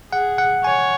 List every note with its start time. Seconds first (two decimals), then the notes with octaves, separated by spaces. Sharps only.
0.12 G#4 F#5
0.38 F#5
0.64 C#5 G#5